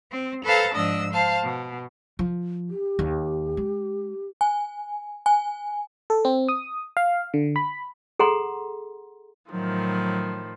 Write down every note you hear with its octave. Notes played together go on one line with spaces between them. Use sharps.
C4
A4 B4 C5 F5 A5 A#5
G#2 F3 D4 D#5 E6
C5 F5 A5
B2
F3
G4
D#2
G#3
G#5
G#5
A4
C4
D#6
F5
D3
B5
G#4 A4 F#5 A#5 C6
A2 D#3 F3 F#3